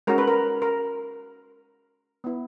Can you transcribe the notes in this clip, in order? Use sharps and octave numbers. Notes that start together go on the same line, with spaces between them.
G#3 C#4 F#4 A#4
B4
A#4
A#4
B3 E4